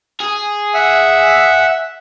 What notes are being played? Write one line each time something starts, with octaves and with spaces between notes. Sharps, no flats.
G#4
E5 F#5 E6